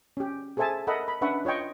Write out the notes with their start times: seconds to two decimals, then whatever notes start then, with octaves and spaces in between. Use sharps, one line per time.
0.17 C#4 G4
0.57 G#4 A4 C5 E5 G#5 A5
0.87 A4 A#4 D#5 E5 F#5 B5
1.08 B5
1.21 C#4 D4 B4 E5 F#5 C#6
1.45 F4 C#5 D#5 G5 C#6